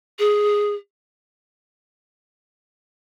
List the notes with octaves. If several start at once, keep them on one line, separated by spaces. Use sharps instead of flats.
G#4